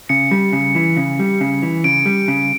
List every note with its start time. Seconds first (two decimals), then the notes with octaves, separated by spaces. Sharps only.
0.09 C#3 C#7
0.31 G3
0.53 C#3
0.75 E3
0.97 C#3
1.19 G3
1.41 C#3
1.62 E3
1.84 C#3 D7
2.06 G3
2.28 C#3